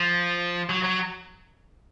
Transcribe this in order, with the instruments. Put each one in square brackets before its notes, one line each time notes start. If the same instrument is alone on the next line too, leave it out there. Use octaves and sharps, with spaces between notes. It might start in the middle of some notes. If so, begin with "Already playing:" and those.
Already playing: [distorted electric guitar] F3
F#3
F#3